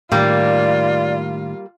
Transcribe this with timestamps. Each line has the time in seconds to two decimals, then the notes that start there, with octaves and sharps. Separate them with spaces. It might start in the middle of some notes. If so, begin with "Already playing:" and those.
0.12 A2 D#3 G3 A#3 F4 D5